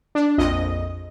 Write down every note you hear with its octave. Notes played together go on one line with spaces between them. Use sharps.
D4
A#1 F2 D#5